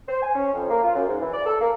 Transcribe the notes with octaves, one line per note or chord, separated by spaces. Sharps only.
C5
G#5
C#4
F2
A#3
F4
F#2
G#2
E3
D5
A4
A#3